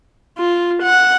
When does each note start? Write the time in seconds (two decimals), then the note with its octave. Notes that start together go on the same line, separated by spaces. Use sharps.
0.38 F4
0.83 F#5